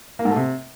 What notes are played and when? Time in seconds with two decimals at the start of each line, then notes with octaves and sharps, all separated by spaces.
0.19 A#3
0.25 G#2
0.31 A3
0.36 C3